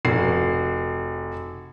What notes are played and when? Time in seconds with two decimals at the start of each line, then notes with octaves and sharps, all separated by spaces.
0.05 F1 F#4 C7